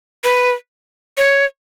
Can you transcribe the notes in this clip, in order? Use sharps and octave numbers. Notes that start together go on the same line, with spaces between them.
B4
C#5